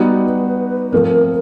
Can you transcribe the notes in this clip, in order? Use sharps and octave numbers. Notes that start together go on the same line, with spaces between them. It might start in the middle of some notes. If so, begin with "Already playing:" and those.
Already playing: G3 B3 D#4 F#4 B4
F3 A3 C4 A#4